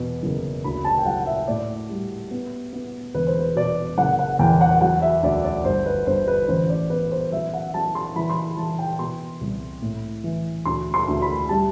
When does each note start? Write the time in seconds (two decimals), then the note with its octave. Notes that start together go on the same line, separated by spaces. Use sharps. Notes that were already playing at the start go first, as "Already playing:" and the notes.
Already playing: E2 B2
0.23 F#1
0.64 D2 B5
0.85 A5
0.98 G5
1.06 F#3 F#5
1.26 E5
1.48 A2 D5
1.90 G3
2.31 B3
2.73 B3
3.14 E1 B4
3.27 C5
3.39 B4
3.56 B2 D5
3.97 F#1 F#5
4.19 F#5
4.39 E2 G5
4.61 F#5
4.81 F#3 F#5
5.02 E5
5.23 D2 D5
5.44 D5
5.65 G1 C5
5.86 B4
6.06 G1 C5
6.28 B4
6.48 A1 C5
6.69 D5
6.90 B3 B4
7.12 C5
7.32 F#3 E5
7.54 F#5
7.74 F#3 A5
7.95 C6
8.16 E3 B5
8.30 C6
8.36 B5
8.57 E3 A5
8.79 G5
8.99 B2 C6
9.41 C2
9.82 A2
10.24 E3
10.65 D2 C6
10.94 C6
11.08 D2
11.22 B5
11.49 G3 A5